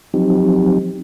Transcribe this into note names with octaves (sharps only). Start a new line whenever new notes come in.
F3 F#3 C4 D#4 G4